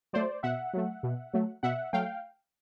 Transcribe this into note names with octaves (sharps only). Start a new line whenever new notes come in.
F#3 A3 C5 D5
B2 E5 F#5
F#3 A3
B2
F#3 A3
B2 E5 F#5
F#3 A3 F5 G5